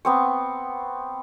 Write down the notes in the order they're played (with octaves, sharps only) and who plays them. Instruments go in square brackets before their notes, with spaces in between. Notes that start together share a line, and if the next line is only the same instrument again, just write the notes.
[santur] B3 C4 C#6